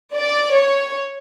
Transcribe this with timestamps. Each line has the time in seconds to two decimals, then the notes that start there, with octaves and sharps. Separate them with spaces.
0.14 D5
0.53 C#5